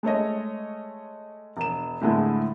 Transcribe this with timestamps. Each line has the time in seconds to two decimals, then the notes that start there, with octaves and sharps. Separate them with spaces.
0.03 G#3 A3 C#5 D#5
1.57 E1 E7
2.01 A2 D3 G#3 A3 E4